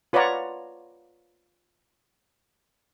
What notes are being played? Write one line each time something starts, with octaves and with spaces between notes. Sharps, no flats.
F4 B4 C#5 D5 F#5 A#5